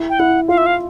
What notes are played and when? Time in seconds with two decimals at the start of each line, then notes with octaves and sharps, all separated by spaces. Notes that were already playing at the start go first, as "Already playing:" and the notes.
Already playing: E4
0.10 G5
0.19 E4 F#5
0.48 F4 F5
0.58 E5
0.66 F5